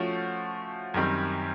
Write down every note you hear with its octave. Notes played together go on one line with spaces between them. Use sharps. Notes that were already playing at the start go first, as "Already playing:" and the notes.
Already playing: F3 A3 C#4 F#4
F#2 D#3 G3 C4